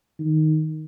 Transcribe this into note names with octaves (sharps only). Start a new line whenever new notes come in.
D#3